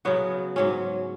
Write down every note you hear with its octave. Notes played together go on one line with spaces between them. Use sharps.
C#3 F#3 B3 F#4
G#2 F#3 C#4